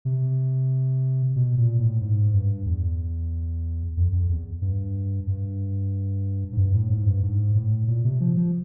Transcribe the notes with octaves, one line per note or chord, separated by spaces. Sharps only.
C3
B2
A#2
A2
G#2
G2
E2
F2
F2
E2
G2
G2
G#2
G2
A2
G#2
G2
G#2
A2
A#2
C3
F3
F3